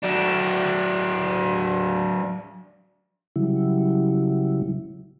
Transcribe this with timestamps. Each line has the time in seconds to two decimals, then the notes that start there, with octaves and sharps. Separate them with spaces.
0.03 F#3 D4
3.36 C#3 F#3 G3 E4